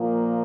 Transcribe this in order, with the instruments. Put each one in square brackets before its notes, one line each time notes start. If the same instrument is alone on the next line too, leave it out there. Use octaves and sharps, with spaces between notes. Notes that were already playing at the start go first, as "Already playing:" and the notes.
Already playing: [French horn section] A#2 F3 A#3